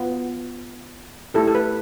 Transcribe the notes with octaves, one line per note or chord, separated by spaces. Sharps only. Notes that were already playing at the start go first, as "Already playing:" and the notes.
Already playing: B3 F4
A3 E4 G4 A4
A4
B4